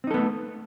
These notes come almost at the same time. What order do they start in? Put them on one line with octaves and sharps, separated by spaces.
C4 D#4 A4 B3 A3